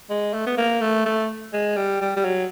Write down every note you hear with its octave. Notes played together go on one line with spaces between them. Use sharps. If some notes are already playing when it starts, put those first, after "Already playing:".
G#3
A3
B3
A#3
A3
A3
G#3
G3
G3
G3
F#3